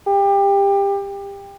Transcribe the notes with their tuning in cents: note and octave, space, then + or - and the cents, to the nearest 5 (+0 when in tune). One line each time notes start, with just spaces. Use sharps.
G4 +25